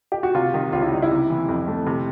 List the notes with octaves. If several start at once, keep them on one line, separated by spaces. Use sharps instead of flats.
G4
F#4
C3 F4
D#3
C#2 F4
E4
G3 D#4
E4
C3
E3
F2
A3
C3